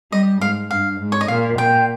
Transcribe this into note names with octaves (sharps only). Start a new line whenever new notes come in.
G3 D#5
G#2 F5
G2 F5
G#2
C#5
D#5
A#2 F5
A#2 G5